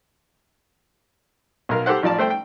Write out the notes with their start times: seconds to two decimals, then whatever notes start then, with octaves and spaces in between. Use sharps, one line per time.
1.69 B1 A#4 F5
1.86 G4 A4 C5 F#5
2.03 A1 F3 D5 A5
2.18 A3 C5 G5
2.30 G5